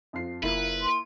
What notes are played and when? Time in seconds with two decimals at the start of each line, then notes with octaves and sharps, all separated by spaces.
0.13 F2 F4 C7
0.43 F#1 A#3 E4 F4 B4
0.82 C6